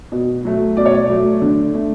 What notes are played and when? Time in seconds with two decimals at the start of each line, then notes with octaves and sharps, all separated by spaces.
0.12 B2
0.45 F#3 A3
0.77 B2 D5
0.86 C#5
0.94 D5
1.10 F#3 A3
1.42 D3
1.74 A3